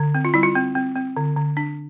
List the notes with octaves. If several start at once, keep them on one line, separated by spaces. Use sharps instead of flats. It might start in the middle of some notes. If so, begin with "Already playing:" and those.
Already playing: D3
C4
F4
G3 E4
F4
C4
C4
C4
D3
D3
D4